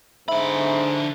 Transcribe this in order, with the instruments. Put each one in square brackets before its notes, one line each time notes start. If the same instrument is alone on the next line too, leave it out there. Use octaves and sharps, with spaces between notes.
[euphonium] G#2 [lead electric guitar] D3 B5 [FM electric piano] E5